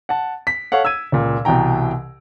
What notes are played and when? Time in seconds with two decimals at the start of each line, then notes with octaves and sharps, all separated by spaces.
0.09 F#5 A5
0.47 B6
0.72 A4 C#5 F5 F#5
0.85 E6 G#6 D#7
1.12 C#2 A#2
1.45 C2 B2 E3 G5 A#5